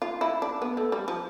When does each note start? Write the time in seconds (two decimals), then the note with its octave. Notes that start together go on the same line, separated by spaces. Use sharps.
0.02 F4
0.21 E4
0.42 D4
0.62 B3
0.77 A3
0.92 G3
1.08 F3